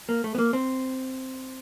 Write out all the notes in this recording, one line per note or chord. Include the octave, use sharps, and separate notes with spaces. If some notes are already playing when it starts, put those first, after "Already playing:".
A#3
A3
B3
A#3
C4